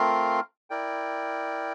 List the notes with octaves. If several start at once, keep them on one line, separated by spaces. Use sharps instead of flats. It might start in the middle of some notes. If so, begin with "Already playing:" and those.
Already playing: A3 C4 F4 A#4 F5
E4 A#4 D5 G5